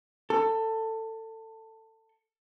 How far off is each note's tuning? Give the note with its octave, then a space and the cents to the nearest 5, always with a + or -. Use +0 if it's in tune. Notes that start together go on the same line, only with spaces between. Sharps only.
A4 +20